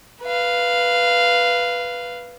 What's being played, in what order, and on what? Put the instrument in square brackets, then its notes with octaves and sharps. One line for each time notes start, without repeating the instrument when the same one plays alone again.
[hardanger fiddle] B4 F5